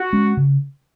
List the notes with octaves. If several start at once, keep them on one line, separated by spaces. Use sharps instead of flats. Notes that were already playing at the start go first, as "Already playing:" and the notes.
Already playing: F#4
G#3 C#4
C#3